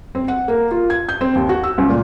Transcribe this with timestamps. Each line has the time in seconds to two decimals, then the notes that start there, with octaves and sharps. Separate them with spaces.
0.15 C4
0.28 F#5
0.48 A#3
0.71 F4
0.90 G#6
1.09 G6
1.21 C4
1.35 D#2
1.49 F#4
1.63 E6
1.78 C#2
1.90 A#2